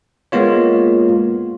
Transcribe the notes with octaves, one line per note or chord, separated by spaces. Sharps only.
G#3 A#3 B3 F4 C#5